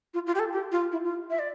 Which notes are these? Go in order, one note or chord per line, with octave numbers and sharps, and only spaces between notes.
F4
F4
G4
A4
G4
F4
E4
F4
E5
D5